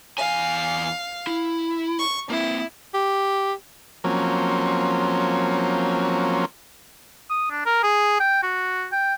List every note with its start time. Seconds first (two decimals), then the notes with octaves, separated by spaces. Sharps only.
0.18 E2 F5 G#5
1.27 E4
1.99 C#6
2.30 A#3 C4 E4
2.94 G4
4.04 F3 F#3 A#3 C4 C#4
7.30 D#6
7.51 D4
7.66 A#4
7.83 G#4
8.20 G5
8.43 F#4
8.92 G5